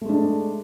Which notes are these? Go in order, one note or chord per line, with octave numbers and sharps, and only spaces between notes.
G#3 A3 D4